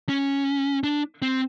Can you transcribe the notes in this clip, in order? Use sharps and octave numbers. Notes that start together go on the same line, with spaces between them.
C#4
D4
C4